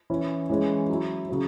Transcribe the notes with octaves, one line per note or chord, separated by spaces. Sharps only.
E3 C#4 E4
E3 G#3 C#4
F#3 E4
C#3 F#3 C#4